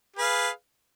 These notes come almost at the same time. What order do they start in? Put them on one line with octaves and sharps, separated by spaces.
G#4 B4 F5